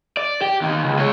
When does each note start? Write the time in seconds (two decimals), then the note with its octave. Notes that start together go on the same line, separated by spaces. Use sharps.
0.17 D5
0.42 G4
0.62 D#2 D#3
0.84 C#2
0.99 G#3 C#5